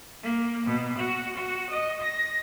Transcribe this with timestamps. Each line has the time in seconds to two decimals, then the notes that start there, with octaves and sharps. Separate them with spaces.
0.24 A#3
0.67 B2
0.97 F#4
1.36 F#4
1.70 D#5
2.03 A#6